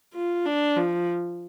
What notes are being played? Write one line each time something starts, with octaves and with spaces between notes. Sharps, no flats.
F4
D4
F3